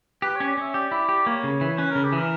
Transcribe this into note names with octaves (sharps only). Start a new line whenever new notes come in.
G4 B4
C#4 C#5
D5
C#4 E5
G4 D5
E4
G4
A#3 C#5
C#3
E3
C#4 B4
C#3 A#4
G4
E3 A#4